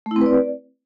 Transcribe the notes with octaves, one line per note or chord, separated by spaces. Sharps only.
A3
E4
C4
B4
D5